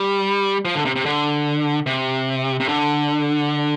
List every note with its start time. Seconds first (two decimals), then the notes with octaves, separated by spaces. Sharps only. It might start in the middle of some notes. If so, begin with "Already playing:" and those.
Already playing: G3
0.65 F3
0.75 D3
0.85 C3
0.96 C3
1.05 D3
1.86 C3
2.60 C3
2.68 D3